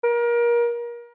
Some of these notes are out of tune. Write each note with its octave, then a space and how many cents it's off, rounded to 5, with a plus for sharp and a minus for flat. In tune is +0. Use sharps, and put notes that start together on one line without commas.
A#4 +30